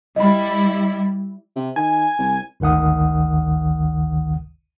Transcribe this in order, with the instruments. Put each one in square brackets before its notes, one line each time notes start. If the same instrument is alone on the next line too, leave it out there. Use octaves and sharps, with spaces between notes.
[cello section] G3 E4 [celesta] D#5 B5
[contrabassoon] C3
[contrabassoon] D#3 [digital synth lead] G#5
[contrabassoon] C2
[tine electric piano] G#1 D2 D#3 F#5 D#6